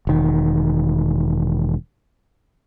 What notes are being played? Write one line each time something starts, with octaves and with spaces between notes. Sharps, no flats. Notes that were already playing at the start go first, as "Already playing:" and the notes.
E1 D#3